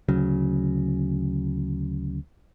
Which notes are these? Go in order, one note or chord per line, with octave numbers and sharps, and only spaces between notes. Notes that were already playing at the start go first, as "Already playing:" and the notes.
D2 C#3 F#3